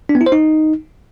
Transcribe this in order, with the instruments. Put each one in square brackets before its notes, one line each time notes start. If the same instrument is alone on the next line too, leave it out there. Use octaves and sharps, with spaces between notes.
[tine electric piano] D4
B3
E4
C5
D#4